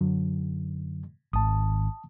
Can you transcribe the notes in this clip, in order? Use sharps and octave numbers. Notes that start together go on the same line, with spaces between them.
F#2 D3 F#3
G#1 A5 D#6